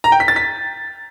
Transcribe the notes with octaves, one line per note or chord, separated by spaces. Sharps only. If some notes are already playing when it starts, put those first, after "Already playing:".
A#5
G5
B6
A6
B6